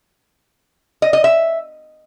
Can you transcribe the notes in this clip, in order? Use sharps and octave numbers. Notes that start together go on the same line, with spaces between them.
D#5
D#5
E5